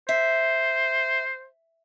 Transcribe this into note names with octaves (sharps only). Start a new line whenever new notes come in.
C5 E5